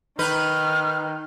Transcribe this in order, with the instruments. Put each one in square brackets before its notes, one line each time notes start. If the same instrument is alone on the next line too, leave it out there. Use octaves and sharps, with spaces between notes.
[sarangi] D#3 [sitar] D#4 B4 [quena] F6